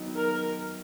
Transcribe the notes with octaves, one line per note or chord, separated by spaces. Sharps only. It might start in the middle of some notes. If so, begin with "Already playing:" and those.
Already playing: D#3 F#3 B3 D#4
A#4